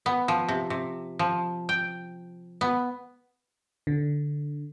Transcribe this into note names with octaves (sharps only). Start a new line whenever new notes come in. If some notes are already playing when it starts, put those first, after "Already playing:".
B3
F3
C3
C3
F3
G5
B3
D3